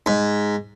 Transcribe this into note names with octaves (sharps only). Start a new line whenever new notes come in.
G#2